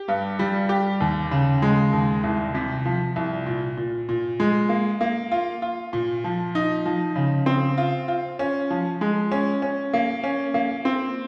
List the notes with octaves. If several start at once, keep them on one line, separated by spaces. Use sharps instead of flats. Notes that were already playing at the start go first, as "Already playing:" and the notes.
Already playing: G4
G2
G3
G4
D#2
C#3
G#3
D#2
C2
C3
F3
C2
A#2
A#2
A#2
G#3
A#3
A#3
F4
F4
A#2
F3
D#4
F3
C#3
C4
F4
F4
C#4
F3
G#3
C#4
C#4
A#3
C#4
A#3
C4